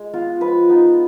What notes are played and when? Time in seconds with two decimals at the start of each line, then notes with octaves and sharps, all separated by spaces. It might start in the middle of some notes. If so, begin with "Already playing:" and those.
Already playing: G#3
0.13 B3 F4
0.41 F3 B4
0.69 B3 D#4